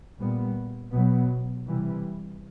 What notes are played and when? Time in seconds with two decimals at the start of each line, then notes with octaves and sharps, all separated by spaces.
0.19 A#2 G3 B3
0.93 B2 F#3 B3
1.67 C3 E3 G3